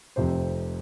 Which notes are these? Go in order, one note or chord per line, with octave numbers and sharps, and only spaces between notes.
F1 F2 C3 C5